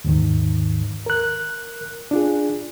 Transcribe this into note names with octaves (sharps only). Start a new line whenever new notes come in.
D#2 G#2 D#3
A#4 F#6
D4 F4 G#4